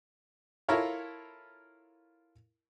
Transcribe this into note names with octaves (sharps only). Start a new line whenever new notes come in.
E4 F4 A4 A#4 C#5 F5